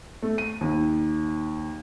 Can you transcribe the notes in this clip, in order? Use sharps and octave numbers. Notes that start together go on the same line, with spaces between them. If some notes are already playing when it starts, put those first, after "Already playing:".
A3
D#7
D#2